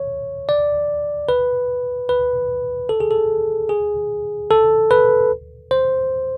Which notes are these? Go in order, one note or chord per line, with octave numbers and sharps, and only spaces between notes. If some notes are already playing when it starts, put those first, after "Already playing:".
Already playing: C#5
D5
B4
B4
A4
G#4
A4
G#4
A4
B4
C5